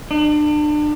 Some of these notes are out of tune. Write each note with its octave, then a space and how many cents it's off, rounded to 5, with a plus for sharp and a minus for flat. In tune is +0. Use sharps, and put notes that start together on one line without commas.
D4 +35